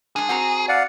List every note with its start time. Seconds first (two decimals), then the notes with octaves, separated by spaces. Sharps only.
0.16 G#3 D4 G#4
0.29 C4 F#4 A#5
0.69 D5 F5 F#5